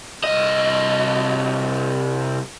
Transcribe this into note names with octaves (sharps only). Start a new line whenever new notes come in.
C2 D#5